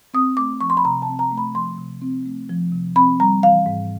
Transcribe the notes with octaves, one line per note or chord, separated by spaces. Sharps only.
C4 D#6
A3 D6
F3 C#6
C6
B5
C3 A#5
A5
C4
A#5
A3
B5
F3 C6
C3
C4
A3
F3
C3
C4 B5
G3 A#5
E3 F5
G#2